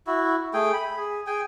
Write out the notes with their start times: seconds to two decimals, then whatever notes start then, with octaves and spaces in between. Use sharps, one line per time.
0.07 E4 F#4
0.54 A3 G#4 G5
0.74 B5
0.97 G#4
1.27 G#4 G5 G#5